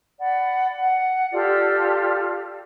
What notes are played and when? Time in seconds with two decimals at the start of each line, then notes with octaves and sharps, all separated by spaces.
0.19 D5 F#5 B5
0.75 F#5
1.31 F4 G4 A4 D5